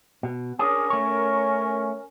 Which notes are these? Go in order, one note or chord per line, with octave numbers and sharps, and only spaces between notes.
B2
C#4 D4 G#4 A#4
A3 C#5